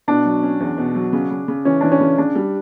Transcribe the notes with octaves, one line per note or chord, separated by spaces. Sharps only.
B2 D4
F#3
C#4
E2
B2
F#3
C#3
C#3
C#3
E3 C#4
E3 D4
C#4
C#3
C#3 D4
G3